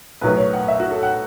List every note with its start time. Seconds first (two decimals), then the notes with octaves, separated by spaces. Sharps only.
0.21 B1 A2 F#3 B3 B4
0.37 C#5
0.53 F#5
0.68 E5
0.80 F#4
0.91 A4
1.03 F#5